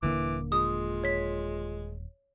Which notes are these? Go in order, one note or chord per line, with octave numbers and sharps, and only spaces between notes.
D#1 D3 E3 A#3 D6
G#3 F4 D#6
C#5 B6